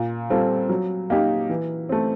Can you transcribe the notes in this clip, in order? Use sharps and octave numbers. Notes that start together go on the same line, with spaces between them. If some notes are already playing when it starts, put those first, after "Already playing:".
Already playing: A#2
G3 C4 F4 A4
F#3
A#3 D#4 G4
E3
A3 C4